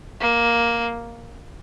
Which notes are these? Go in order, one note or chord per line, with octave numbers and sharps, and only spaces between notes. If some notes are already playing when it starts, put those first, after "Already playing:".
A#3